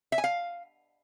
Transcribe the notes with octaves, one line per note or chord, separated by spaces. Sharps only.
E5
G#5
F5